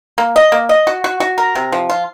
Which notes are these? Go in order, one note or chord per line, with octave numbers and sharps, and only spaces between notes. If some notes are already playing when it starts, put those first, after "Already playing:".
A#3
D#5
A#3
D#5
F#4
F#4
F#4
A#4
C3
F3
F4